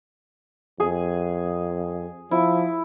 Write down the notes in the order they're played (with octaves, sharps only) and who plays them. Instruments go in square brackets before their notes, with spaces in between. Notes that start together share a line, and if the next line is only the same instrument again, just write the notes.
[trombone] F2 [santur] G#4
[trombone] F3 [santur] E4